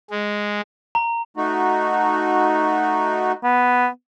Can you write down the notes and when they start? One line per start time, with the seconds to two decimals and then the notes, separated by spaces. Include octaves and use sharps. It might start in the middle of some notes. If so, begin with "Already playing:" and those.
0.10 G#3
0.95 A#5
1.37 A3 D#4 F#4
3.44 B3